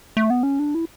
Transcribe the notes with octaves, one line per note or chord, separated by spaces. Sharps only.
A3
B3
C#4
D4
E4